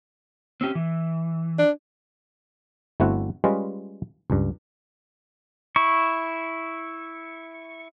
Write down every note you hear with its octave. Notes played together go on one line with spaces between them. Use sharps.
C4 C#4 G4
E3
D4
G1 A3 C4 E4 F#4 F#5
G3 G#3 C#4 F4 B4 D#5
C#2 G2
E4 C#6